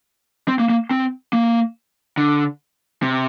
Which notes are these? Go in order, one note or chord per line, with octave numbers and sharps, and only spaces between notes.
C4
A#3
A#3
C4
A#3
D3
C3